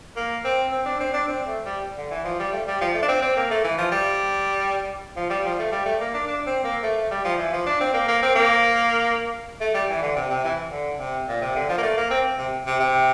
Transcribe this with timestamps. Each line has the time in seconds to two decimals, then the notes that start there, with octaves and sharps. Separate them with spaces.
0.16 A#3
0.44 C4
0.72 C4
0.86 D4
1.00 C4
1.13 D4
1.28 C4
1.46 A3
1.66 G3
1.97 D3
2.11 E3
2.25 F3
2.39 G3
2.52 A3
2.67 G3
2.81 F3
2.95 A3
3.02 D4
3.09 C4
3.22 C4
3.37 A#3
3.51 A3
3.64 E3
3.78 F3
3.92 G3
5.16 F3
5.30 G3
5.45 F3
5.59 A3
5.72 G3
5.85 A3
6.00 A#3
6.14 D4
6.28 D4
6.46 C4
6.64 A#3
6.83 A3
6.97 A3
7.11 G3
7.24 F3
7.38 E3
7.53 F3
7.66 D4
7.80 C4
7.94 A#3
8.08 A#3
8.22 C4
8.35 A#3
9.61 A3
9.74 G3
9.89 E3
10.02 D3
10.16 C3
10.30 C3
10.44 E3
10.71 D3
10.99 C3
11.28 A#2
11.41 C3
11.56 D3
11.69 F3
11.78 A#3
11.82 A3
11.97 A#3
12.10 C4
12.38 C3
12.67 C3
12.80 C3